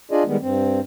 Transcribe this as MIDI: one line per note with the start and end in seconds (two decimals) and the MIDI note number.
0.11 0.23 62
0.11 0.23 65
0.11 0.23 68
0.11 0.23 74
0.11 0.23 75
0.27 0.37 51
0.27 0.37 55
0.27 0.37 56
0.27 0.37 59
0.42 0.80 43
0.42 0.80 60